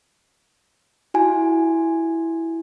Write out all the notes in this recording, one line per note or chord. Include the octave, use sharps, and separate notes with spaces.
E4 F#4 G#5